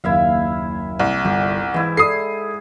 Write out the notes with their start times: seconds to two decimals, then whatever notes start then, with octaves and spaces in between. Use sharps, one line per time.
0.04 F#1 D#2 E4 E5 F5
0.99 C2
1.25 G1 G4
1.74 G#2 E3 E4
1.97 A4 D5 D#6 C7